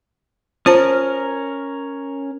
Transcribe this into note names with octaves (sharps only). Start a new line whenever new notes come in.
C#4 F4 A#4 C5 A5